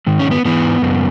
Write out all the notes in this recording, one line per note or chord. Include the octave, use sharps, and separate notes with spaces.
G#2 D#3
C#4
B3
G#2 E3 B3
F#2 C#3